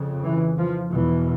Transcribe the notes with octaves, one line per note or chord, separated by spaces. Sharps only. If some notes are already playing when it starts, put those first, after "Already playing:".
Already playing: F2 C#3
E3
F3
E2 B2 E3